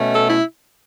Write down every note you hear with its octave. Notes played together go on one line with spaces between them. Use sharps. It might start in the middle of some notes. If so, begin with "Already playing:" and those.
Already playing: B2 A3 C#4
A4
E4